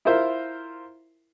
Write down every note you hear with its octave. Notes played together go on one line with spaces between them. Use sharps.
E4 F4 A#4 C5 E5